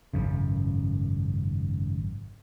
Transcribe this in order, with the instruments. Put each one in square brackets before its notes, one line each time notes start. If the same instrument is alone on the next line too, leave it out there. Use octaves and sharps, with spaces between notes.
[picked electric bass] G#1 F#2 C#3